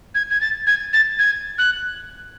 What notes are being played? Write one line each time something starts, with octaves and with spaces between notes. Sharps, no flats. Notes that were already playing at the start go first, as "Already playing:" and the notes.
G#6
G#6
A6
G#6
A6
G#6
F#6